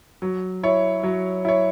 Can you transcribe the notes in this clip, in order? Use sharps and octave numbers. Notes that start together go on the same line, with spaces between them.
F#3
E4 C#5
F#3
E4 C#5